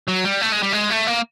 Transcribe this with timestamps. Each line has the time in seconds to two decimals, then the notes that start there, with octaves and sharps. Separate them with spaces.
0.08 F#3
0.25 G3
0.41 A3
0.53 G#3
0.63 G3
0.73 G#3
0.91 A3
1.08 A#3